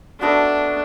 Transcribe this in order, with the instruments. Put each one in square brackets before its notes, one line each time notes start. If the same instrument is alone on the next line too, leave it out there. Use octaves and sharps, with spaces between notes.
[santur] A3 B3 F#4 [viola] D4